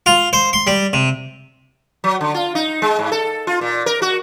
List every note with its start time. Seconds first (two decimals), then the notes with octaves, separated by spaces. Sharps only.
0.06 F4
0.33 C5
0.53 C6
0.67 G3
0.93 C3
2.04 F#3
2.21 D3
2.34 F4
2.55 D#4
2.82 G#3
2.99 G#2
3.12 A4
3.47 F4
3.61 A#2
3.86 A#4
4.02 F#4